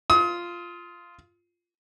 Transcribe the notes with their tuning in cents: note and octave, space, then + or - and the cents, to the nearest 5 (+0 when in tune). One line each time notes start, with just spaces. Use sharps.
F4 -5 D#6 +35